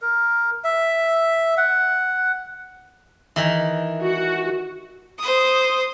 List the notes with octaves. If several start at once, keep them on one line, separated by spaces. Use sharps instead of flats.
A#4
E5
F#5
D#3 E3
F#4
C5 D#6